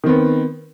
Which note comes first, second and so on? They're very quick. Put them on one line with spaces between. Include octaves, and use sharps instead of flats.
D#3 C4 B3